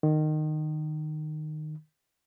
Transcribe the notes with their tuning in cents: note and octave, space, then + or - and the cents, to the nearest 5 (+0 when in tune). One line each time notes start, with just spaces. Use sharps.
D#3 -20